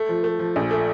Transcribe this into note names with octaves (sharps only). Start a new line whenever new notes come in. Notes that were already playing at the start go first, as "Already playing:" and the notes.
Already playing: A3
F3
A3
F3
A#1
A3